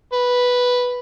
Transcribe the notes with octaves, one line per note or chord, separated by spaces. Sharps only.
B4